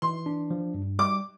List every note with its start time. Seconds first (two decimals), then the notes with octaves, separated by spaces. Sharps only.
0.02 E3 C6
0.26 D4
0.50 F3
0.74 G2
0.99 G3 D6